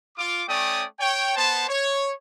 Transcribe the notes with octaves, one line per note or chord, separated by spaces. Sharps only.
F4 D6
A3 C#4 C#5 D5 G5 D#6
C#5 G5
B3 C5 A5
C#5